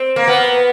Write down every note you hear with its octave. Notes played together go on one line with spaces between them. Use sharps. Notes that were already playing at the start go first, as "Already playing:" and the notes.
Already playing: C4
A#3
B3